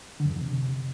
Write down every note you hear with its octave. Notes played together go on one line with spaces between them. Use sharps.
D3
F#2
E2
F2
C3